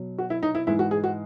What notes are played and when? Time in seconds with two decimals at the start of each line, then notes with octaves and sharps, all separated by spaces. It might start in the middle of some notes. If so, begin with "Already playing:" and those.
Already playing: B2 F#3
0.18 F#4
0.30 E4
0.43 D#4
0.55 E4
0.67 G#2 E3 G#3 E4
0.79 F#4
0.91 G#4
1.04 F#4